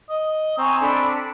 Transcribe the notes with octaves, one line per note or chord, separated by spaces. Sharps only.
D#5
C4 G#5 A#5 C#6
D4 A4 B5